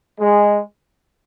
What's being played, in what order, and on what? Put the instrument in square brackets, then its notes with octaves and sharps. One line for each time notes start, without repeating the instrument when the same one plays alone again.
[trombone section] G#3